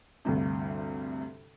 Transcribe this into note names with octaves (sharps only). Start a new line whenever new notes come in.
D2 G2 C3